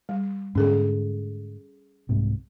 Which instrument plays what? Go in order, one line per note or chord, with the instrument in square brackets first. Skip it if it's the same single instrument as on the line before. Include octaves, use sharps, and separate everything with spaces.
[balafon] G3
[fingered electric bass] G#2 D3 [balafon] C#4 G#4 A4
[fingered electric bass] C2 G#2 C3